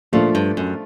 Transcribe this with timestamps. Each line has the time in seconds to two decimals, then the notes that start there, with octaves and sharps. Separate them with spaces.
0.13 A#2 F3 A3 D4 F4
0.35 G2
0.57 F#2